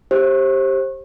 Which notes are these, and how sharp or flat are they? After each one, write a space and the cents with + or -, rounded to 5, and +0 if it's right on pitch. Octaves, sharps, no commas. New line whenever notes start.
G4 +0 C5 +30